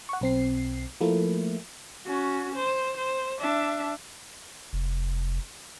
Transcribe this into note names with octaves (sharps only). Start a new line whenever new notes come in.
F#5 C#6
B1 C4 C7
F3 A3 A#3 E4
C#4 F#4
C5
C5
D4 E5
F1